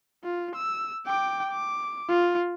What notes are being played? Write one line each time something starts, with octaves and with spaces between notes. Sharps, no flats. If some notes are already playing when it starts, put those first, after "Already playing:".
F4
E6
G5 D6
D6
F4